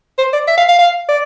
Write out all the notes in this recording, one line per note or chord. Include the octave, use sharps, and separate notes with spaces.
C5
D5
E5
F5
F5
F5
D5